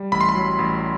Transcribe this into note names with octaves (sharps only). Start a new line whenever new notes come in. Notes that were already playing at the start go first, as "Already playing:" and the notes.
Already playing: G3
A1 B5
C6
B5
F#3
A1